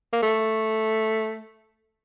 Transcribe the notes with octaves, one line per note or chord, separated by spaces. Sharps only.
A#3
A3